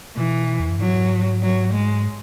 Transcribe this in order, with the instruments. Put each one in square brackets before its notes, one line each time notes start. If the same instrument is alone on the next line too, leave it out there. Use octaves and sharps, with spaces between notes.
[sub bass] B2 [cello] E3
[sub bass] E2
F#2
[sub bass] G#2 [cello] F#3
[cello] F#3
G#3